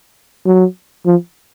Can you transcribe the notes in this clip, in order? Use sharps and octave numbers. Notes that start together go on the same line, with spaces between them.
F#3
F3